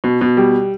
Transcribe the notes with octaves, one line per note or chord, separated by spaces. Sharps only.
B2
B2
G3